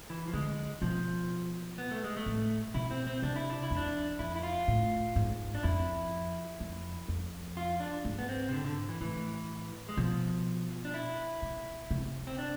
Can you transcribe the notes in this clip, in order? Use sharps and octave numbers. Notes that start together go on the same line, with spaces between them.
E3
F3
D3 G#3
B2 F3
B3
A3
G#3
A3
A2
B2 E4
C4
C4
C3 D4
E4
D4
E4
F2
D4
F2 E4
E4
F4
A2
G#2
D4
F2 E4
F2
F2
F4
D4
G#2
B3
C4
C3
D3
D3
E3
A2 E3
G#3
B2 F3
D4
E4
B2
C3
C4
D4